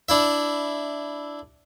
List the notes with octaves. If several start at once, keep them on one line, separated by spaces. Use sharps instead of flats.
D4 E4 E5